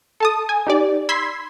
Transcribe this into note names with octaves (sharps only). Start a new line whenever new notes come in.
A4 A5 D#6
G#5
D#4 G4 D5
B5 C6 E6 G#6 B6 C7